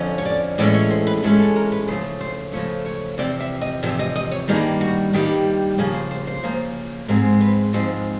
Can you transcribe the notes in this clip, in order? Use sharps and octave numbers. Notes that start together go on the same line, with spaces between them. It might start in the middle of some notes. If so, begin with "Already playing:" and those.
Already playing: F2 D3 F3 C#4
C#5
D5
A2 E3 G#3 C#4 D5
C#5
C5
B4
A2 E3 G#3 C#4 A4
A4
A#4
B4
C#3 F3 A3 C5
C5
C#3 F3 A3 C#5
C#5
E2 C3 F3 D5
E5
D#5
E2 C3 F3 E5
D#5
D#5
C#5
G2 D#3 G3 A#3 G#4
F#4
G2 D#3 G3 A#3 G4
C#3 F3 A#3 G#4
C5
C5
C5
C#3 F3 A#3
G#2 F3 G#3 C4 A#4
B4
G#2 F3 G#3 C4 C5